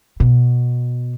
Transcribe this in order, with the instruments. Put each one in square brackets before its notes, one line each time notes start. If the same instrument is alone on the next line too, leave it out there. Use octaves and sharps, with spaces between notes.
[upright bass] B2